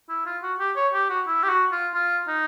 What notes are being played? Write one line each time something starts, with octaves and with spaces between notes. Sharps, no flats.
E4
F4
F#4
G4
C#5
G4
F#4
E4
G4
F#4
F4
F4
D#4